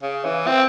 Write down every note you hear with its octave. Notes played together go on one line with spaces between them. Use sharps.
C#3
E3
C4